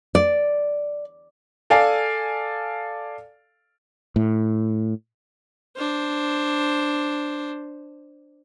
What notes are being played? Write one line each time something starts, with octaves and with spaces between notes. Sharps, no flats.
D5
A4 D5 F5 G#5
A2
D4 C5